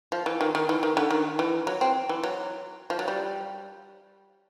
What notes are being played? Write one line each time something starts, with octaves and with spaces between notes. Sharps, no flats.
F3
E3
D#3
D#3
E3
D#3
D3
D#3
E3
F#3
C4
E3
F#3
F3
F#3
G3